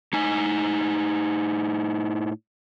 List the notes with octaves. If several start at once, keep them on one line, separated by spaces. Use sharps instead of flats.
A2 D#4 G#5